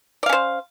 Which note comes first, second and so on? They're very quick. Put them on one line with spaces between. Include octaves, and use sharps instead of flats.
D5 F5 C#4 C5